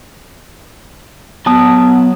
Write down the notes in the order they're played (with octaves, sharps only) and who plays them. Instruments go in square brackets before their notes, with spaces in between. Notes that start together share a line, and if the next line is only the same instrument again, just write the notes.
[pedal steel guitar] F#3 A5 D#6 [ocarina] B3